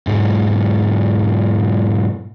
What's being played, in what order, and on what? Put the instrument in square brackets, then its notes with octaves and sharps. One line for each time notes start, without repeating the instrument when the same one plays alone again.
[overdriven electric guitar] B1 G#2